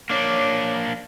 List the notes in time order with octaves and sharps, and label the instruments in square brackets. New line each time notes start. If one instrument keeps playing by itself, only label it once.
[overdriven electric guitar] A#3 D4 [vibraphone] C#5 D6